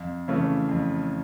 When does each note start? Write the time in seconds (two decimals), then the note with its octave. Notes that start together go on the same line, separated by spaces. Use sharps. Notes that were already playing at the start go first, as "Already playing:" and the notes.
Already playing: F2
0.28 C#3 E3 A3 C#4
0.69 F2